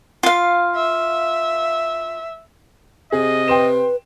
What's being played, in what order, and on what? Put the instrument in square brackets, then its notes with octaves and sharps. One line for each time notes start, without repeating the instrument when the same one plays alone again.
[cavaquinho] F4 F5
[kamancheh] E5
[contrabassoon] C3 [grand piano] G#4 [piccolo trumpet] D#5
[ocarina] B4 [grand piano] G5 C6 E7